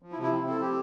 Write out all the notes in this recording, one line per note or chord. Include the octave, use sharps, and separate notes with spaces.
F3
E4
C3
E4
C4
C4 A4
G4